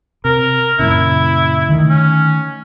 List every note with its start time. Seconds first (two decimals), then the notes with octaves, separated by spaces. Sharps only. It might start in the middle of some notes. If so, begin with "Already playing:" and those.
0.25 C3 A#4
0.79 F#2 A#2 C#3 E4
1.69 D3 D#3 A3
1.89 C#4